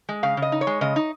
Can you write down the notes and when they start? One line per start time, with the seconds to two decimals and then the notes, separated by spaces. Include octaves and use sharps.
0.09 G#3
0.23 C#3 F5
0.37 C#3
0.42 D#5
0.52 D#4
0.61 C#5
0.67 G#3
0.81 C#3 D#5
0.96 D#4